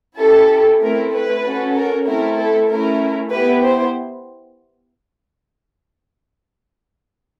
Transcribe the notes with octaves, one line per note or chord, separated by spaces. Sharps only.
C#4 E4 G4 A4
A3 C4 E4 A#4
B4
C#4 F#4 A4
A#4
A3 C4 E4 A#4
A4
A3 C#4 E4 A#4
B3 E4 G4 B4
C5